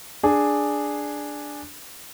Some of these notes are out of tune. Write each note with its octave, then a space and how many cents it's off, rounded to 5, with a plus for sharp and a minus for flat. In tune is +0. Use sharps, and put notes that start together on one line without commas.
D4 +0 G#4 +0